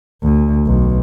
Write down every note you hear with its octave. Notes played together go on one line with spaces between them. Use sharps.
D2
B1